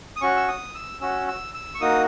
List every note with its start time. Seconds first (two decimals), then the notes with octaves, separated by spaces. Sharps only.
0.16 D#6
0.21 C#4 F#4 C#6
0.37 E6
0.48 D#6
0.75 E6
1.01 C#4 F#4 E6
1.28 E6
1.54 E6
1.75 C#6
1.81 A#3 D#4 F#4 D#6